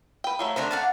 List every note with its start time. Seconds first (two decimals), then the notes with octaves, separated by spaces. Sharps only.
0.24 B4 G5
0.39 F3 F#3 A3
0.56 D3 A3 D4 A#4 C5
0.71 D5 F5 F#5